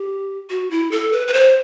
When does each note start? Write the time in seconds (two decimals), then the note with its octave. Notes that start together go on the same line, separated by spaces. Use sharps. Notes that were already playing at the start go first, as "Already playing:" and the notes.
Already playing: G4
0.50 F#4
0.71 E4
0.91 A4
1.13 B4
1.28 B4
1.33 C5